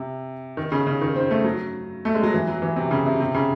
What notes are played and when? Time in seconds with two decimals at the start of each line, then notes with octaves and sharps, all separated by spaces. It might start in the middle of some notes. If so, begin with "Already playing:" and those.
Already playing: C3
0.57 D#3
0.72 C#3
0.87 C#3
1.01 D#3
1.16 C4
1.31 A3
1.44 F#3
2.05 A3
2.15 G#3
2.23 F#3
2.33 E3
2.47 F#3
2.62 E3
2.76 C3
2.91 C#3
3.06 C3
3.20 C3
3.35 C#3